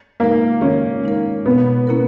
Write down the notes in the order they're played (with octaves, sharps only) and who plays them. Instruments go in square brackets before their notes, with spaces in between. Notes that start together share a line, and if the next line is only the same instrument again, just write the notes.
[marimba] G#3 D#4 A#4 [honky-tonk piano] A#3
[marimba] D#3 [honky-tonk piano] C#4
[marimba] G#3 D#4 A#4
[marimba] B2 [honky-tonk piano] B3
[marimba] A#3 C#4 E4 A#4